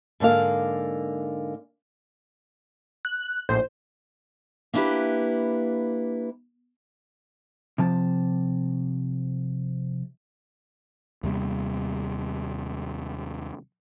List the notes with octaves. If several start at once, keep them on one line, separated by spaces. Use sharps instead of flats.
G#2 D3 A#3 F5
F#6
A#1 A2 C5
A#3 D4 E4 G4 B4
C3 F3 A5
D#2 C3 G3